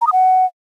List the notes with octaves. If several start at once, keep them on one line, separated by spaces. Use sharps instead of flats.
A#5
D#6
F#5